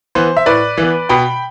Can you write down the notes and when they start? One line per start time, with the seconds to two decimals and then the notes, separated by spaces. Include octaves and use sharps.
0.15 E3 B3 C5
0.37 E5
0.46 A2 B4 D5
0.78 E3
0.83 B3
1.09 B2 G5 B5